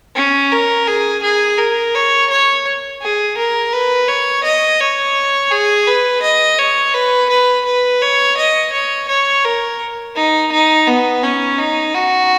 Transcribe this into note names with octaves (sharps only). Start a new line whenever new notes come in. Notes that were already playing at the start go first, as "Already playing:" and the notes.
C#4
A#4
G#4
G#4
A#4
C#5
C#5
G#4
A#4
B4
C#5
D#5
C#5
G#4
B4
D#5
C#5
B4
B4
B4
C#5
D#5
C#5
C#5
A#4
D#4
D#4
B3
C#4
D#4
F#4